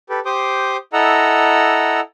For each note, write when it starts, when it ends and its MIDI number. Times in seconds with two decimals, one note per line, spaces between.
0.10 0.20 67
0.10 0.20 69
0.10 0.20 71
0.25 0.77 67
0.25 0.77 72
0.25 0.77 84
0.25 0.77 86
0.25 0.77 87
0.93 2.00 64
0.93 2.00 69
0.93 2.00 75
0.93 2.00 78
0.93 2.00 82
0.93 2.00 88